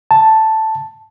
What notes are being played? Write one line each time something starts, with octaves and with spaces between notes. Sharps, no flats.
A5